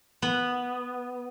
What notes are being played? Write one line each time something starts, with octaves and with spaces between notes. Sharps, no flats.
B3